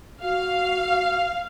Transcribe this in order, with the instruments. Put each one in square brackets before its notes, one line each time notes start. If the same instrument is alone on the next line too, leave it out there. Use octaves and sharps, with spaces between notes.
[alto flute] F#4 [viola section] F5